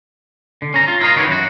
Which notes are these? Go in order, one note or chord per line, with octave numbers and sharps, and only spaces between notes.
D3
C#4 A#5
F4
E4 F4 A#4 D#5 F5
D#3 F#4 G4 B4 C#5
F#2 F#4